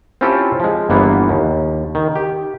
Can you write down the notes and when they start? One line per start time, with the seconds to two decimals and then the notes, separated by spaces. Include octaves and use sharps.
0.21 C4 C#4 E4 F4 G4 A4
0.60 F3 G#3
0.90 G1 E3 A#3 B3
1.29 D#2
1.95 D#3
2.16 G4